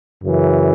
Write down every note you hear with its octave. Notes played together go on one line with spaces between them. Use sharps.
F#2 C#3 E3